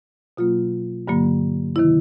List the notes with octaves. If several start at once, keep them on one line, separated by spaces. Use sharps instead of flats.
B2 F#3 A#3 F4
G2 D3 F#3 A#3
C3 D#3 E4